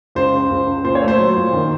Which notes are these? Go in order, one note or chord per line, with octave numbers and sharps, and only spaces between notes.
C#2 C5
C#3
C#2
C#2
A#2 C5
C#5
A3
C5
F#3
A#2
D#3